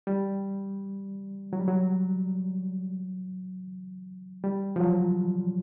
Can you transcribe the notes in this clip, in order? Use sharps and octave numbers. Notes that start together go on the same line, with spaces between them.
G3
F#3
G3
F#3
G3
F3
F#3